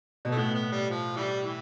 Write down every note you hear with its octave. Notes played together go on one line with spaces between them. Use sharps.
B2
A3
A2 B3
B3
G3
F3
E3 G3
E3